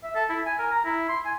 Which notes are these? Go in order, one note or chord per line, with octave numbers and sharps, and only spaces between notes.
E5
A4
E4
G#5
A#4
A#5
E4
C6
G#5